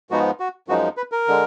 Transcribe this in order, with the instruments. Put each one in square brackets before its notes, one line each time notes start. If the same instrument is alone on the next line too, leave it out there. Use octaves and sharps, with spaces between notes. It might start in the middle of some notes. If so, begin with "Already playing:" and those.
[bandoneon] G#2 F3 G#3 B3 D#4 F#4
F#4
F#2 F3 G#3 D#4 F#4
B4
A#4
D3 G#3